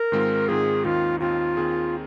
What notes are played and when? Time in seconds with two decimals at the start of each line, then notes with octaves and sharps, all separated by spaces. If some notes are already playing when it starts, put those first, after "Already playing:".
Already playing: A#4
0.12 G#2 D#3 G#3 C4 F4
0.48 G#2 D#3 G#3 C4 F4 G#4
0.84 D#2 D#3 C4 D#4 F4
1.20 D#2 D#3 C4 D#4 F4
1.57 D#2 D#3 C4 G#4